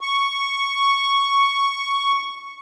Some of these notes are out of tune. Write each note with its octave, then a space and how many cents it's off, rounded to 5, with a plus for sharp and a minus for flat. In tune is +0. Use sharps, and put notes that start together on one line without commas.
C#6 +0